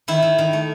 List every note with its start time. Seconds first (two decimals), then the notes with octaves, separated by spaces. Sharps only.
0.08 D#3 E4
0.22 D#3
0.38 D#3
0.53 A3